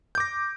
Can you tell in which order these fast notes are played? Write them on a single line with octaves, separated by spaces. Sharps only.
G6 D6 A#6